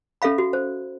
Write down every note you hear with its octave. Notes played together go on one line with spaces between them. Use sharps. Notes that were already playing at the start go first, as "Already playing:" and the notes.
C#4 A4 E5 F5 B5
F#4
C5